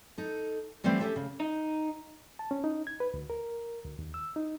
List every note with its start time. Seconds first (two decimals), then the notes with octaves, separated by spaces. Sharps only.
0.18 D#4 A4
0.84 E3 G3 A3 B3 C4
0.99 A3 C#4 G4 A4 E5
1.16 C#3
1.40 D#4
2.39 A5
2.51 C#4
2.64 D#4
2.87 G#6
3.00 B4
3.14 D2
3.30 A#4
3.84 D2
3.99 D#2
4.14 E6
4.36 D#4